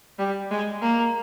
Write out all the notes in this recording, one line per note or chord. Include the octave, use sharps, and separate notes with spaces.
G3
G#3
A#3